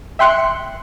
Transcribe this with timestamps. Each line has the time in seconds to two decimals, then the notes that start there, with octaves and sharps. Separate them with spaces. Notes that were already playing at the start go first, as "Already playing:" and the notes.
0.19 E5 G5 C6 F#6 C#7